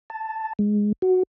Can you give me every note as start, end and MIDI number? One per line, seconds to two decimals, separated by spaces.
0.10 0.53 81
0.59 0.92 56
1.02 1.23 66